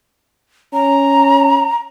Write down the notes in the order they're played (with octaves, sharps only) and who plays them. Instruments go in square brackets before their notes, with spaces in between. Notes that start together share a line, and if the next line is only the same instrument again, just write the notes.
[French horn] C#4 [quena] A#5